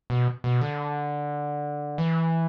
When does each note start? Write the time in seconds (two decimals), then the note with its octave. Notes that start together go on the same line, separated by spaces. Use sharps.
0.10 B2
0.44 B2
0.61 D3
1.98 E3